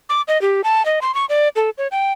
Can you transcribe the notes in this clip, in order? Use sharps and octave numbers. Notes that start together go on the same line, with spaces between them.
D6
D#5
G4
A5
D#5
C6
C#6
D5
A4
C#5
G5